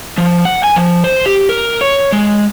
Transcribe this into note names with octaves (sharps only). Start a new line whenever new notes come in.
F3
F#5
G#5
F3
C5
G4
A#4
C#5
G#3